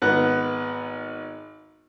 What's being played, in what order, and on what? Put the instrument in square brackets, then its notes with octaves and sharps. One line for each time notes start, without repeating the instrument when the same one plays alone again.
[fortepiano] G#1 B3 F#6